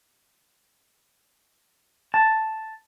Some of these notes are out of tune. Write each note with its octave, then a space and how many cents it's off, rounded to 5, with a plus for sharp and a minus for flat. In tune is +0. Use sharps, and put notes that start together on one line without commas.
A5 +0